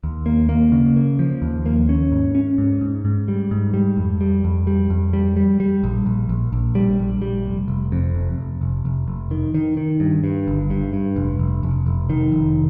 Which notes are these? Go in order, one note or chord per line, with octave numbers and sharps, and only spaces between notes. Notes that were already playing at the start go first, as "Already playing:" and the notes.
D#2
A#3
A#3
C#3
A#3
F3
D#2
A#3
C#4
G#2
C#4
G#2
G#2
G#2
G3
G#2
G3
F2
G3
F2
G3
F2
G3
G3
G3
A#1
A#1
A#1
A#1
G3
A#1
G3
F1
F1
F2
F1
F1
F1
F1
F1
D#3
D#3
D#3
G2
G2
G1
G2
G2
F1
F1
F1
F1
D#3
F1